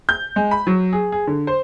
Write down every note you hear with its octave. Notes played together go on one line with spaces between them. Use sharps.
G6
G#3
B5
F#3
G#4
G#4
D3
C5